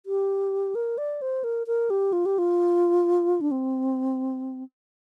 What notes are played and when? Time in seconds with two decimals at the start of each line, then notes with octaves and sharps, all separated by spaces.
0.06 G4
0.75 A#4
0.98 D5
1.22 C5
1.44 A#4
1.67 A#4
1.90 G4
2.13 F4
2.26 G4
2.38 F4
3.41 D4
3.51 C4